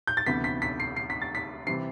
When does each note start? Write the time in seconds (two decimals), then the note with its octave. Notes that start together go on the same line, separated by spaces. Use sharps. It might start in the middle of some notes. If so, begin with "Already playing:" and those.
0.07 G6
0.17 A6
0.26 D2 C3 E3 B3 B6
0.44 B6
0.62 B6
0.80 C7
0.96 C7
1.10 B6
1.22 A6
1.35 B6
1.67 C3 E3 G3 C4 C7